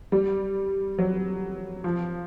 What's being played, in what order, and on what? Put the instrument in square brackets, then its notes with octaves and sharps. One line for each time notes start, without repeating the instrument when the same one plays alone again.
[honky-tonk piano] G3
F#3
F3